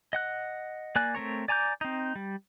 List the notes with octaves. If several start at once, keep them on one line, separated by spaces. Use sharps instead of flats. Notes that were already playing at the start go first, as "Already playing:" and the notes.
D#5 F#5 F#6
A#3 D5 G#5 F#6
A3 C4 A#4 C#5
D5 G#5 A#5 D6 G6
C4 D#4
G3